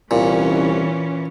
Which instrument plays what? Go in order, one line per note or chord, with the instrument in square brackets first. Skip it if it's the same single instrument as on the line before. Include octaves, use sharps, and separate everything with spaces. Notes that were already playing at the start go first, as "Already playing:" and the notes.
[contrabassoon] C2 [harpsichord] A#2 [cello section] E3 C#4